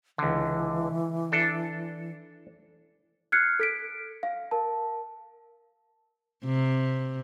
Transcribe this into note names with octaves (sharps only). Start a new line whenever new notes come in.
C#2 D3 E3
D4 A4
F6 F#6 G#6 C7 C#7
A4 B6 D7
F5
A#4 A5
C3